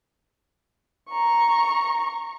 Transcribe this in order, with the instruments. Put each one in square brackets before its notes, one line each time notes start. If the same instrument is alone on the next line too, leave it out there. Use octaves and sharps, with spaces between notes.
[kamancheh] A#5 C#6